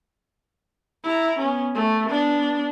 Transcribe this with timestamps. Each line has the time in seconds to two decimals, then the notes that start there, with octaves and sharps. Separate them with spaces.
1.04 E4 A#5
1.39 B3 C#4
1.75 A3
2.09 B3 D4